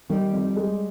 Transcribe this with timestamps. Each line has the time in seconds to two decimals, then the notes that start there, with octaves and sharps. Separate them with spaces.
0.09 D#3 G3
0.33 F2
0.57 G#3